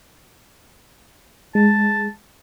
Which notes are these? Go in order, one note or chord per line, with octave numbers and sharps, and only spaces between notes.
G#3 A5